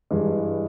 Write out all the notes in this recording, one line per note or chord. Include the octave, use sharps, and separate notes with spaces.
G2 E3 G#3